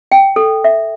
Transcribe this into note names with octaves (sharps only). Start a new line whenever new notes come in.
G5
A4
E5